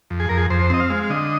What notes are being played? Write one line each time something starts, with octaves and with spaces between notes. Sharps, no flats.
F2
G#4
F2 A#4
G#4
F2 C5
C4 D#5
F5
G#3
F5
D3 D#5